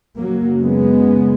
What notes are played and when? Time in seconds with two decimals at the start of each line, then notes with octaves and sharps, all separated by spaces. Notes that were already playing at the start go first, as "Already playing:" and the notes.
0.17 F#2 C#3 F#3 A#3
0.61 G#3 B3